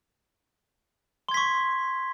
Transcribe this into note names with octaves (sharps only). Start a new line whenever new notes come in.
C6 C#6 G#6 B6